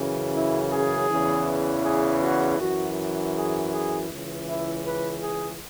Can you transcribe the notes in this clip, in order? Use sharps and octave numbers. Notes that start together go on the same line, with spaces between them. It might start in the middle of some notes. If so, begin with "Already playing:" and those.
Already playing: F#2 C#3 E3
E4
G#4
E2 C#3 E3
G#4
F#4
F#2 E3 F#4
G#4
G#4
C#2 C#3 E3
E4
B4
G#4